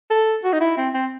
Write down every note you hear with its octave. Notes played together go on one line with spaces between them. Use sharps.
A4
F#4
D#4
E4
C4
C4